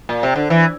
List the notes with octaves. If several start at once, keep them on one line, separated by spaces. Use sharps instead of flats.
A#2
C3
D3
E3